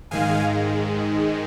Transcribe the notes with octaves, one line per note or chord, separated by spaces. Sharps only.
G#2 D#3 G#3 F5 G#5